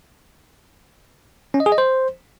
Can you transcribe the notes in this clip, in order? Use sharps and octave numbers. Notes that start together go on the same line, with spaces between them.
C#4
D#5
G#4
D#5
C5